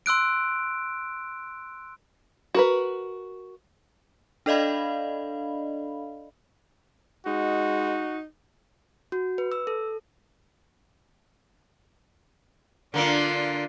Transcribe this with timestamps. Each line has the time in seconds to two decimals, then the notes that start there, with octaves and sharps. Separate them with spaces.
0.06 C6 E6 F#6 D7
2.54 F#4 A#4 B4
4.46 D4 A4 D5 D#5 F5 B5
7.26 G#3 D#4 F#4
9.12 F#4
9.38 B4
9.52 E6
9.67 A4
12.94 D3 A#3 D4 F4